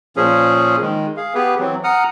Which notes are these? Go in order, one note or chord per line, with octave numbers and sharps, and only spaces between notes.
A#2 F3 C#4 G#4
D#3 G#3
G#4 F5
B3 G4 G#4 B4
E3 F#3 C4
F#5 A#5 D#6 F6